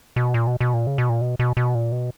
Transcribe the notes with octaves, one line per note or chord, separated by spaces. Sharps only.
B2
A#2
B2
B2
A#2
C#3
B2
A#2
B2
B2
B2
A#2
B2